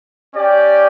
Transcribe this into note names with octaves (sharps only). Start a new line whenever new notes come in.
C#4 G4 D5 G5